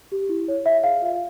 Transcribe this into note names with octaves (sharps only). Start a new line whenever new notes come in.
G4
E4
C#5
C#5 E5
G#4 F5
F4